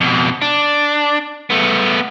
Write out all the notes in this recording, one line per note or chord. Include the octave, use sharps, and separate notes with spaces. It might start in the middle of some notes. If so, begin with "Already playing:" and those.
F2 B2
D4
A3 B3